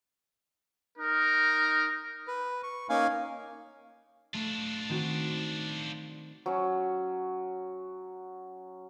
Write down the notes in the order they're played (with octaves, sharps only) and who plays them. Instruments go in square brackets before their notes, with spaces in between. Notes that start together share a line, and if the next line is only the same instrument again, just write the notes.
[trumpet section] D#4 A#4
[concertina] B4
C#6
A#3 C#4 D#4 F5 G#5
[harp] A3 [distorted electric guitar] D4 F4
[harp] D#3 C4 F#4
[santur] F#3 C#4